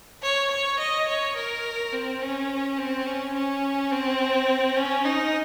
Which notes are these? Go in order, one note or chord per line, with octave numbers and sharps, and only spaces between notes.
C#5
C#5
D#5
C#5
A#4
C4
C#4
C4
C#4
C#4
C4
C#4
D#4